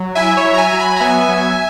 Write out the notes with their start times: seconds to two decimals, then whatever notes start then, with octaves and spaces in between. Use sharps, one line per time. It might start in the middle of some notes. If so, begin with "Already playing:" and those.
Already playing: F#3
0.15 E4 E5 G#5
0.37 C#5 E5
0.44 F#3
0.54 A#5
0.58 E5 G#5
0.70 F#3 A#5
0.79 G#5 B5
0.96 A#5
1.00 B3 E5 G#5
1.29 F#3